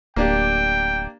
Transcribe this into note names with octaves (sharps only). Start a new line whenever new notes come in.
D1 A#3 D4 G4 G5